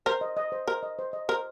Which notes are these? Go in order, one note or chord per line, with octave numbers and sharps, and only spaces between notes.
A#4 C5
D#5
D#5
C5
A#4 C5
D#5
C5
D#5
A#4 C5